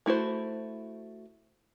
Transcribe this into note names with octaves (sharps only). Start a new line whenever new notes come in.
A3 E4 F#4 C5